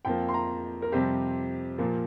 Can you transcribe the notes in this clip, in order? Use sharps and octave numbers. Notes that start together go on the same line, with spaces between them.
F2 F3 A#3 G5
C6
A#5
A#4
F2 C3 G3 C4 G4
A#2 F3 A#3